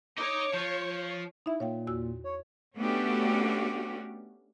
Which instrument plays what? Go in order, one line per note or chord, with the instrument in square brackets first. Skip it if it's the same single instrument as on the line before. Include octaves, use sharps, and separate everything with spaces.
[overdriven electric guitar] D#4 D#5 [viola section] C#5 [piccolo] D6
[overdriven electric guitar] F3 F4 [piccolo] G6
[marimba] D#4 E5 [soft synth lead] E4
[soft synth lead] A#2 [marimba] C#5 F5 G5
[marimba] E2 F#4 E6
[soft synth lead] C#5
[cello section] A3 B3 C#4 D4 F#4 G4